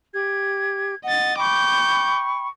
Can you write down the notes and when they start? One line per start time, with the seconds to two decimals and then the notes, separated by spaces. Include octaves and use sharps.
0.14 G4 G#6
1.05 D#5 F#5 A6
1.38 G5 B5 C#6 D6 G6